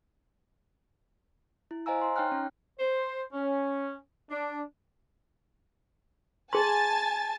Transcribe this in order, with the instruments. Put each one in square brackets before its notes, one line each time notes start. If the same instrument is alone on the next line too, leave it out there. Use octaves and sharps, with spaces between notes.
[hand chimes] E4
C5 D#5 F5 G#5 A#5 E6
A#5 C6
D#4 C#5 G5 F6 F#6
C#4
[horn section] C5
C#4
D4
[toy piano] G#4 C6 [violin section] G#5 A5 A6